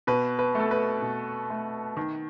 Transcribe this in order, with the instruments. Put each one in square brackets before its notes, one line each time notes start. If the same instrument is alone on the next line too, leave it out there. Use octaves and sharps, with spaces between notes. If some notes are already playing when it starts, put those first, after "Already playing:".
[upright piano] B2 B4
B4
A3 A4
B4
B2
A3
D#3